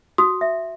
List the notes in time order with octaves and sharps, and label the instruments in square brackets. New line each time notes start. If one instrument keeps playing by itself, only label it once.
[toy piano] F#4 [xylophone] D#6
[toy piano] E5